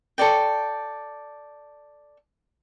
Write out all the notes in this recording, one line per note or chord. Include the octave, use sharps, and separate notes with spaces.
A4 C#5 D5 G5